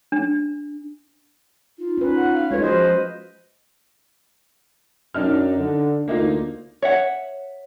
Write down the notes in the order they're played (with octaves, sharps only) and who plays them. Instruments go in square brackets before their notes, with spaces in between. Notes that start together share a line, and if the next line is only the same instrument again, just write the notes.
[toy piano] D4
[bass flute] D#4 [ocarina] F4
[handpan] C#4 B4 [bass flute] D#4
[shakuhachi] F#5
F5
[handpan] G#3 F4 B4 [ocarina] D#4 [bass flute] A4 [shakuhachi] C#5
[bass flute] F3 [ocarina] F#4 [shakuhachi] C5 [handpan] D#5
[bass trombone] F#2 [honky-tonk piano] D4 D#4 F6
[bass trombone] D3
[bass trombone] D2 [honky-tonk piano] A#3 D#4 F4
[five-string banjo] C#5 E5 F#5